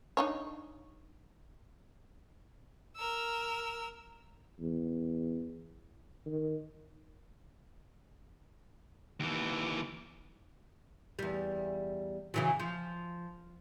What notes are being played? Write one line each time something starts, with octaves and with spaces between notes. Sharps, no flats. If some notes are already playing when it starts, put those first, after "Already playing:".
D4 D#4 C#5
A#4 E6
E2
D#3
D#2 E3
E2 G3
C#3 E3 F#3
F3